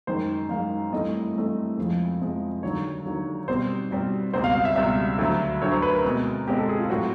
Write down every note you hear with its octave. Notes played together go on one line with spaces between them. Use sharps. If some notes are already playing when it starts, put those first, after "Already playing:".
F#2 D#3 G#3 C5
F#2 D#3 G#3 F5
G2 E3 A3 C4 D#5
G2 E3 A3 C4
F2 C3 F3 G#3
F2 C3 F3 G#3
D#2 D3 F#3 C#5
D#2 D3 F#3
B2 G3 C4 C5
B2 G3 C4
C#2 B2 G3 C4 C5
F5
F5
E5
C#2 B2 G3 C4 E5
D2 D3 F#3
D2 D3 F#3 C#5
C5
B4
A#4
B2 G#3 C4
B2 G#3 C4 G4
A4
G#4
F4
A2 F#3 A3 C4 F#4